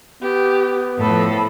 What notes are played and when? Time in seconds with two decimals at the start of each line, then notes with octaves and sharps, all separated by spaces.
0.22 B3 G4
1.00 A2 F3 A4 B5